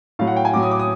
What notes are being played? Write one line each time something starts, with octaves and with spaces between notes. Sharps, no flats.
A2 F#3 F5
F#5
G5
G#5
A2 F#3 D6
D#6
D6
D#6